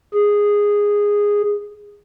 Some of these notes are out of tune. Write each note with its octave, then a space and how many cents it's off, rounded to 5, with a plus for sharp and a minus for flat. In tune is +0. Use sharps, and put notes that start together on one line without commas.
G#4 -10